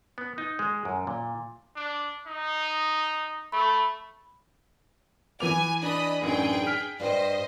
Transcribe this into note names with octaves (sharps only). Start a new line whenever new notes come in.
B3
D#4
G#3
F#2
A#2
D4
D#4
A3 B5
E3 B3 G#5 D6 F7
D4 D5 D#5 B5 D#6
A1 F#2 D4 D#4 G#4 G5
F6 B6
G2 G3 C5 D#5 G5